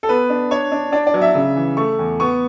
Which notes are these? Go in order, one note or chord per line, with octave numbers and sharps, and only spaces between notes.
A4
B3 B4
D4
D4 C#5
D4
D4 D5
D5
F#3
E5
C#3
E3
A3 C#6
E2
B3 C#6